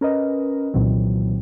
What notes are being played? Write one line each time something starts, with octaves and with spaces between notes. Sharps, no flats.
C#4 A#4 B4 D#5
C2 A#2 D#3 E3 F#3 C4